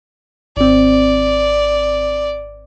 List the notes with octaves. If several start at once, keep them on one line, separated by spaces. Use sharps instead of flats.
G#1 C4 D5